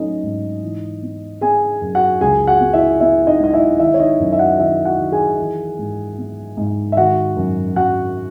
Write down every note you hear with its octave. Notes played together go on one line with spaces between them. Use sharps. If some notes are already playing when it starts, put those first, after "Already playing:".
Already playing: F#3 A3 C#4 D#4 D#5
G#2
E3
B3
B3 G#4 G#5
F#2
F#4 F#5
C#2 G#4 G#5
F#4 F#5
B3
E4 E5
B3 E4 E5
D#4 D#5
G#3 D#5
E4 E5
D#3 E4 E5
C#5
D#4 D#5
F#2
E5
F#4 F#5
D#3 E4 E5
F#4 F#5
D#3
G#4 G#5
E3
G#2
B3
G#2
E5
D#3 F#4 F#5
F#2
F#2 F#4 F#5